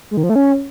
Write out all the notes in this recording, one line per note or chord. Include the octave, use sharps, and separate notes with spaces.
G#3
D#3
F3
A3
C#4